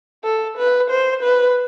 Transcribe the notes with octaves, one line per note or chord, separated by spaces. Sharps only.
A4
B4
C5
B4